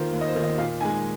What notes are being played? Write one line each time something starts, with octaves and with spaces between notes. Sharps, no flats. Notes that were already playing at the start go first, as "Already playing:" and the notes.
Already playing: D#3 A#3 F4 C5
D#2
D#5
C5
D#3 A#3 F4
D#5
A#2 F5
G#3 D#4 G#5